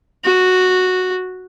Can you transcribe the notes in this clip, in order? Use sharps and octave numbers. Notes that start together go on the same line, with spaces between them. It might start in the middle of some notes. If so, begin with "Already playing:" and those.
F#4